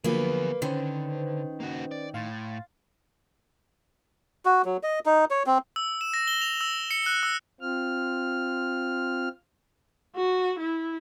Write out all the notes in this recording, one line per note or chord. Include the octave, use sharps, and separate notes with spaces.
D3 F3 F#3 A#3 B3 G#4 B4
D3 D#3 C#4 B4 C5
A#3 F#4
D5
A2 F5 C6 A6
F#4
F#3
D#5
D#4
C#5
C4
E6
E7
A#6
G7
F7
E6
C#7
F#6
E6
C4 F4 F6
F#4
E4